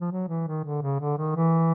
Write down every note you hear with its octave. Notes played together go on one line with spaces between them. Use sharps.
F3
F#3
E3
D#3
D3
C#3
D3
D#3
E3